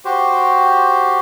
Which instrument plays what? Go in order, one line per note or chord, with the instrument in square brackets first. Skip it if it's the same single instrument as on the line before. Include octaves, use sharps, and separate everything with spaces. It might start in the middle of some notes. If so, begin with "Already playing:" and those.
[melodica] F#4 G4 C5